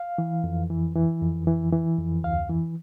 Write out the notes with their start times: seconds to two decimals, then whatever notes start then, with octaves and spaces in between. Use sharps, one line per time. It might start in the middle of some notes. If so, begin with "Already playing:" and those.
Already playing: F5
0.18 E3
0.44 F2
0.70 E3
0.96 E3
1.21 F2
1.47 E3
1.73 E3
1.98 F2
2.24 D2 F5
2.50 E3